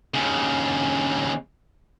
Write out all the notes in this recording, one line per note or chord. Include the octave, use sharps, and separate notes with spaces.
D#2 C#3